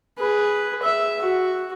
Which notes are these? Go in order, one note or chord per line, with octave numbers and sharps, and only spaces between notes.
G#4 B4
E5
F#4